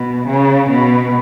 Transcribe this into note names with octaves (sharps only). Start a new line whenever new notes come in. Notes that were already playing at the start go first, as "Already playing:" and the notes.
Already playing: B2
C#3
B2